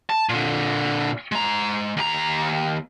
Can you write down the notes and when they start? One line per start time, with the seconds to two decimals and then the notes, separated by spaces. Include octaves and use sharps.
0.10 A5
0.29 A#2 D3
1.32 G#3 A#5
1.97 D#2 A#5